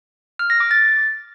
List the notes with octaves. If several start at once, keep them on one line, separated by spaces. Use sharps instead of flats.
F6
A#6
D6
A6